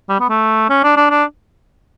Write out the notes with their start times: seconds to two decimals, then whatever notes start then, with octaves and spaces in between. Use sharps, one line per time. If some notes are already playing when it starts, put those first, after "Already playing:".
0.09 G3
0.20 B3
0.29 A3
0.70 C#4
0.83 D4
0.97 D4
1.10 D4